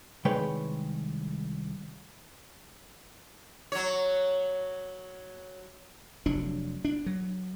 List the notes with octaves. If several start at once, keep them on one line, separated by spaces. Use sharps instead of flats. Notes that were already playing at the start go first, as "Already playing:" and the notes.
C2 D#3 G#3 B4 C#5 G5
F#3 C#5
F1 F#3 D4
D4
F#3